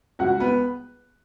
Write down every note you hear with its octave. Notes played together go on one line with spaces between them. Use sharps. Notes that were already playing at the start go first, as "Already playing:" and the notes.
C#2 F#4 F#5
B3 B4